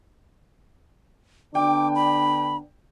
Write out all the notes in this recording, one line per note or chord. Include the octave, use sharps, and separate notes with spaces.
D3 B3 D4 G5 D6
B5